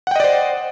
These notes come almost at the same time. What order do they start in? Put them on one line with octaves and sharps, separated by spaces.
F#5 G5 D#5 D5 C5